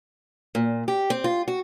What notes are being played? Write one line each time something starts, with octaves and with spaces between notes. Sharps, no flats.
A#2
G4
C4
F4
F#4